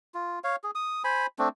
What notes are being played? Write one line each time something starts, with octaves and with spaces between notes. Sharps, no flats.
F4
C#5 F5
G#4
D#6
C5 G#5 B5
A3 C4 D4